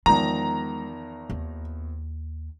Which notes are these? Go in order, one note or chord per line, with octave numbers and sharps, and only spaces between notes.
E2 D#3 F3 G#3 A#5
D#2